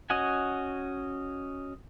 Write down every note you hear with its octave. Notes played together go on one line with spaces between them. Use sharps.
C#4 F#4 D#5 F#5 G#5